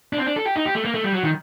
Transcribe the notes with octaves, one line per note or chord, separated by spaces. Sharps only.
D4
C4
D4
A4
G4
D#4
G4
A3
A#3
A3
G3
F#3
D#3